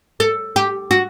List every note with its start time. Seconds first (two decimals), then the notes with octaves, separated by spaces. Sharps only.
0.20 A4
0.56 G4
0.91 F#4